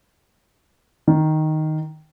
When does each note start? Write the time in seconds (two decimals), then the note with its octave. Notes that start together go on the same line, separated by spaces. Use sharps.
1.07 D#3